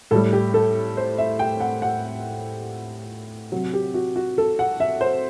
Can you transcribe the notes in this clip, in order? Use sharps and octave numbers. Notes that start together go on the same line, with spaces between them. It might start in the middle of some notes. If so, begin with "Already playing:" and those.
A2 G3 A4
G4
A4
C5
E5
G5
F#5
F#5
C3 F#3
G4
F#4
F#4
A4
F#5
E5
C5